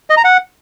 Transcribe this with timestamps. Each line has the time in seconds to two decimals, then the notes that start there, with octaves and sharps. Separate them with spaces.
0.10 D#5
0.17 A#5
0.24 F#5